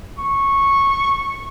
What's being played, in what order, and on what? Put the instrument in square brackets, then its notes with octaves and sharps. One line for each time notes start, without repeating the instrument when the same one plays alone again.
[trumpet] C#6